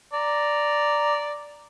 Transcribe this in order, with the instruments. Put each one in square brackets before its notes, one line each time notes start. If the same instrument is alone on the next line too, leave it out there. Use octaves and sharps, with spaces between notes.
[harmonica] D5 A#5